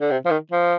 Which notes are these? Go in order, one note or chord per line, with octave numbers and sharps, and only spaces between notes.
D3
C3
F3
D#3
F3